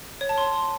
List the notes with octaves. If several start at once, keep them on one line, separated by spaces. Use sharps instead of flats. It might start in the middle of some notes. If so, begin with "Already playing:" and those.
C#5
A5
C6